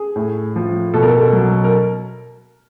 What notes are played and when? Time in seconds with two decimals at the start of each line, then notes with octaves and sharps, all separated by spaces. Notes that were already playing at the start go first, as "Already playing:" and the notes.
Already playing: G#4
0.16 A2
0.56 F3
0.94 B2 A4
1.03 A#4
1.11 A4
1.33 F#3
1.64 A#4